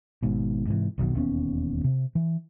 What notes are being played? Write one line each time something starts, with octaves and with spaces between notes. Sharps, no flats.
G#1 G#2 B2
G#2 C3 D#3 E3
F1 B1 B2 D#3
E1 D#2 B3 C#4
C3
E3